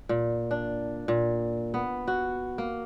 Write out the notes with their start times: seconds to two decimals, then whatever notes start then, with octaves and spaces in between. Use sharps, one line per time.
0.09 A#2
0.51 D4
1.08 A#2
1.74 B3
2.08 F#4
2.58 A#3